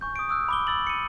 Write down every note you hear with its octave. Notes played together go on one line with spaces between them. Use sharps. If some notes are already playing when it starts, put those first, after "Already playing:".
G#5 C#6 G6
D#6 D7
D#6 E6 F#6
B5 D6 G7
B5 E6 A6 F#7
C#7 D#7